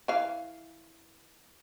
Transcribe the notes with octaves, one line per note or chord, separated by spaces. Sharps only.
E3 F5